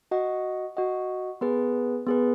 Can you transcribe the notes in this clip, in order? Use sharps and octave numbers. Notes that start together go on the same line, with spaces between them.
F#4 D#5 F#5
F#4 D#5 F#5
B3 G#4 B4
B3 G#4 B4